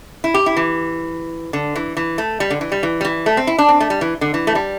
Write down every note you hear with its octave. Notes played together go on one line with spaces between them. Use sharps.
E4
G4
E4
E3
D3
E3
E3
A3
G3
D3
E3
G3
E3
G3
E3
A3
C4
E4
D4
C4
A3
G3
E3
D3
E3
A3
G3